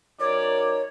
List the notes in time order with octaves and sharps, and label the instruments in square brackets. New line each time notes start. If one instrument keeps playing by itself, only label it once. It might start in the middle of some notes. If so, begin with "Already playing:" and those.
[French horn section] F#2 D#4 A#4 [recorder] C#5 [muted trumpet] D5